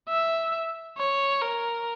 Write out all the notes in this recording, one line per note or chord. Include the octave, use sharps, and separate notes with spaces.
E5
C#5
A#4